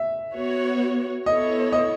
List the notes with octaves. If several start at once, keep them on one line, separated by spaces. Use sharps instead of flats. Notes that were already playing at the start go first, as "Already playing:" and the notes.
Already playing: E5
B3 F#4 C#5
B3 E4 A4 C#5 D#5
D#5